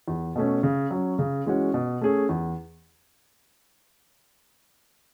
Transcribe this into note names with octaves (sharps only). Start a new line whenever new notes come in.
E2
B2 A3 C#4
C#3
F#3 C#4
C#3
E3 G#3 C#4 F#4
B2
A3 C#4 G#4
E2